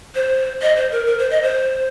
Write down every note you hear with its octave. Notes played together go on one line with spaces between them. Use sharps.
C5
D#5
C5
A#4
A#4
C5
D#5
C5